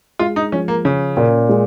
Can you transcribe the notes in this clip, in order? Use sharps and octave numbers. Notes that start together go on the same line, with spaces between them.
G#3 F4
D#4
F3 C#4
A#3
C#3 C#4
A#2
G#3